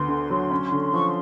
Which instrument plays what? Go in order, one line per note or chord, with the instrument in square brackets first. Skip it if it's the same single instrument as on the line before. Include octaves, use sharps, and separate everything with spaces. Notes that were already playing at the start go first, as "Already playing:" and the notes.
Already playing: [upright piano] D2 B3 [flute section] C6
[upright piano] D3
F#3
C#4
D3
[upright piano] F3 [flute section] C#6
[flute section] C6